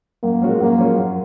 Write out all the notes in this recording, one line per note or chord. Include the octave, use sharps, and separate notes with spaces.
F#2 A#3
F3 G#3 C#4 F#4
F#2 A#3
F3 G#3 C#4 F#4
F#2